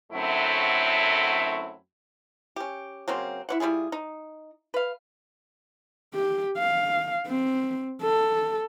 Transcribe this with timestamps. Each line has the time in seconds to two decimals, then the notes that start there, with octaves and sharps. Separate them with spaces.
0.13 F#2 D3 F#3 A3 C4 E4
2.56 C#4 G4
3.08 C#3 F#3 A#3 C4
3.49 E4 C#5 F#5
3.60 G3 E4 F4 G#4
3.92 D#4
4.74 B4 F5
6.14 G4
6.58 F5
7.27 C4
8.02 A4